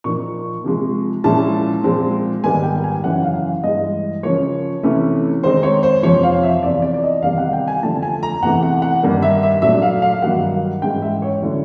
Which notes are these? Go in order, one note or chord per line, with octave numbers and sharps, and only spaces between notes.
A#2 F3 A#3 D#4 C#6
C3 F3 G#3
A#2 F3 G#3 C#4 E4 A5
A#2 F3 G#3 C4
G#2 D#3 G3 B3 G#5
G5
G#5
F#2 C#3 E3 F#5
F5
G2 E3 G#3 D#5
C#3 F3 A#3 C#5
C3 E3 A3 C#4 E4
D#3 G#3 C4 D#4 C5
C#5
C5
F2 C3 F3 C#5
F5
E5
E2 C3 E3 D5
D5
D5
D#5
E2 C3 D#3 G3 F5
F#5
G5
G#5
D3 F3 A3 A5
G#5
A#5
E2 C3 E3 A3 F#5
F#5
F#5
G2 D#3 G3 A#3
E5
E5
A#2 F#3 A3 D4 E5
F5
F5
G2 D#3 F#3 A#3 F#5
G#2 E3 G#3 C#4 E4 G5
E5
C#5
D3 F#3 A3 C#4 E4